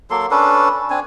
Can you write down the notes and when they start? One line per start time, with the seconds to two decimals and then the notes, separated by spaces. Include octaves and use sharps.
0.10 F#3 A#3 A4 C6
0.31 C#4 D4 A4 B4
0.90 C4 D4 G#5